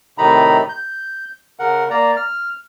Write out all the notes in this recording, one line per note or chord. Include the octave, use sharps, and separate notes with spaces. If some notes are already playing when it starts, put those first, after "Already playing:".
A2 C3 D#3 D#4 A#5 B5
G6
C#3 A#4 F#5
A#3 D5 A#5
F6